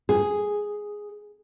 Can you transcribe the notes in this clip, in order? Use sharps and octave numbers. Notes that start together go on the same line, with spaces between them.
G#4